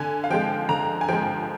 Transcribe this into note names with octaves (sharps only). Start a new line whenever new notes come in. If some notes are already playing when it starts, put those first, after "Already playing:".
Already playing: D3 G#5
F5
F3 G#3 G5
D3 A#5
G#5
F3 G#3 G5